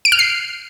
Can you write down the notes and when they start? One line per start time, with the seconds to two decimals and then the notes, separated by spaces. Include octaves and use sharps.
0.05 D7
0.12 F6
0.19 C7